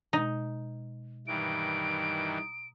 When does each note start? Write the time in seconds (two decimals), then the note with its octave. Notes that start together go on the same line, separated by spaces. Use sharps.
0.13 B2 G#3 D#4
1.27 G2 D#3 E3 D7
2.28 A#5 D#6